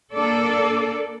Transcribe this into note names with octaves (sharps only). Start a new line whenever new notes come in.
A#3 D4 A4 D5